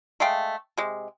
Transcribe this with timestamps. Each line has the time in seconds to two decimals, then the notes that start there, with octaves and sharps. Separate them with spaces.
0.20 G#3 A3 F5 G5
0.78 C3 G#3